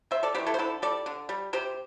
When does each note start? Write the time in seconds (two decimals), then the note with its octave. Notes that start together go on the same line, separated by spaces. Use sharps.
0.11 C3 C5 E5
0.23 A4 D5
0.35 E3 G4 C5
0.38 A3
0.46 E4 A4
0.54 C5
0.58 D3 E4 A4
0.82 G3 A4 D5
1.06 D3
1.29 G3
1.53 C3 G4 C5